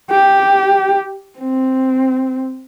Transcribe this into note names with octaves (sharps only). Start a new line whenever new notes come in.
G4
C4